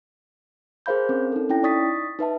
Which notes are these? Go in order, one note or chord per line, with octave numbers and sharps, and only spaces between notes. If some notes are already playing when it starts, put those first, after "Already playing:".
G#4 A#4 C5 F5 B5 G6
C4 C#4 A#4
D#4 A4
C#4 E4 G5 A#6
D#4 D5 C#6 D#6 A6 B6
D#4 B4 E5 A5